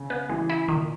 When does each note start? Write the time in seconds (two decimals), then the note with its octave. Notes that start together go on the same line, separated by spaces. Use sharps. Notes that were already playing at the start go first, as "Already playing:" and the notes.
Already playing: C#3
0.10 B3
0.29 E3 G#3
0.50 E4
0.68 A#2 D#3